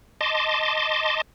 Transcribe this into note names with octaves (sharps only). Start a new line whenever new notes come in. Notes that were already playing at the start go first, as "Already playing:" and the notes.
D#5 A5 C6 D6